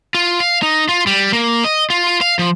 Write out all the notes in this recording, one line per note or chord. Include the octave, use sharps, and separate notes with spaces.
F4
F5
D#4
F4
G3
A#3
D#5
F4
F5
F3